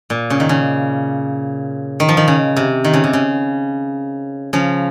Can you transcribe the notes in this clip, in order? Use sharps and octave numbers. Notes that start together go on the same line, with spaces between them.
A#2
C#3
D#3
C#3
D#3
F3
D#3
C#3
C3
D#3
C#3
C3
C#3
C#3 F3